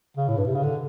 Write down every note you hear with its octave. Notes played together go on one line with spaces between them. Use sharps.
C#3
A2
G2
C3
C#3
D3